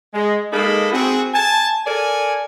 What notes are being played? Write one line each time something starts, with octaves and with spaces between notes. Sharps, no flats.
G#3
G#3 A#3 D#4 A4 D#5 B5
C4 F#4 G#4
G#5 A5
A4 A#4 D5 G#5